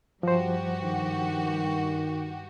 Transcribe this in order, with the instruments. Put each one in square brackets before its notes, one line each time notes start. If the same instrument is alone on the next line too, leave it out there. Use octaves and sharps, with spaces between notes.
[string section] G2 F#4 G4 [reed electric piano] F3 C5
[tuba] D#3